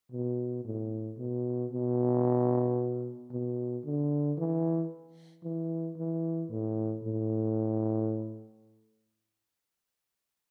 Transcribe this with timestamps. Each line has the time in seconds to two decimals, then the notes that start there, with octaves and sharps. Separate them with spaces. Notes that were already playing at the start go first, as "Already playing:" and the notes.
0.12 B2
0.65 A2
1.18 B2
1.71 B2
3.31 B2
3.84 D3
4.37 E3
5.44 E3
5.97 E3
6.50 A2
7.03 A2